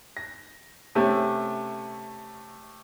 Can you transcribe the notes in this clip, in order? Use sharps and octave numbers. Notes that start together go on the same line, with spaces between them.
A#6
C3 A3 C#4